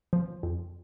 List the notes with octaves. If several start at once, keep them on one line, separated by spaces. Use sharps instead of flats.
F3
F2